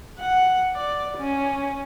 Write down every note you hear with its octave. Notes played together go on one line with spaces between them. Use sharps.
F#5
D5
C#4